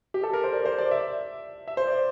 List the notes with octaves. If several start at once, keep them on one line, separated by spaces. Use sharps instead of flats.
G4
A4
A#4
C5
D5
C5
D5
E5
E5
C5
D5